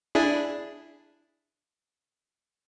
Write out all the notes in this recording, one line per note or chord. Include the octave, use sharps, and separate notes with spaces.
D4 E4 G#4